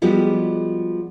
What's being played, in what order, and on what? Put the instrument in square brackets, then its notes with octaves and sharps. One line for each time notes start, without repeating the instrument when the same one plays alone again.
[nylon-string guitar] F3 G3 G#3 B3 F#4 G4